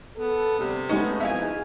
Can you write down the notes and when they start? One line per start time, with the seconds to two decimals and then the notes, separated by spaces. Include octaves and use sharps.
0.16 B3 A4
0.59 D2 C3 G3 D4
0.89 G#3 A3 B3 C#4 D#4
1.20 F2 B2 E4 G#4 E5 F5 G#5